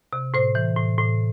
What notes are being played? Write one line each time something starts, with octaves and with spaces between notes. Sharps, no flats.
C3
A2 C5
E3
A2
A2